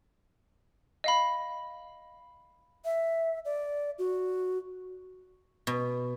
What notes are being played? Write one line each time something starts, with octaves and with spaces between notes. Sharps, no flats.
D#5 F5 B5
E5
D5
F#4
B2